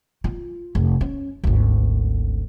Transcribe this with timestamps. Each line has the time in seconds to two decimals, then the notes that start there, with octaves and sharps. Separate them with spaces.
0.24 F4
0.75 F1
1.01 C#4
1.44 G#1 D2